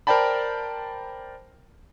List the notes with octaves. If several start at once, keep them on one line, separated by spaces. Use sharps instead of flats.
A#4 C5 D5 G5 A5 B5